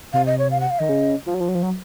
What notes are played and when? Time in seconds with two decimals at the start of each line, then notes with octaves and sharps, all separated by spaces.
0.13 C3 F5
0.26 D#5
0.39 C#5
0.51 F5
0.61 F#5
0.70 F5
0.79 D#3 D#5
0.89 C#3
1.26 F3
1.34 F#3
1.40 F3
1.49 F#3
1.55 F3
1.63 F#3